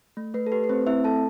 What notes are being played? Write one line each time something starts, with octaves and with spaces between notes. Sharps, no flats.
A3
A3 B4
A4
G4 B4
B4
A3 C4 C5
C4 E4 E5
A3 A4 A5